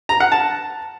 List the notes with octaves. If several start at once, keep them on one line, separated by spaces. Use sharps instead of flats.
A#5
F#5
A5